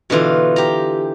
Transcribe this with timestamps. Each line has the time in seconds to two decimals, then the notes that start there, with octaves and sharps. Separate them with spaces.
0.10 B2 D3 E3 F4
0.56 G4 A#5